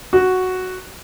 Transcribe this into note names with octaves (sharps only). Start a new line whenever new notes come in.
F#4